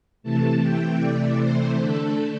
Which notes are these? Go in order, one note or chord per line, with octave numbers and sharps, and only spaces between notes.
C3 E3 A3 A5
G5
D5
C5
D3 A3 D4 A4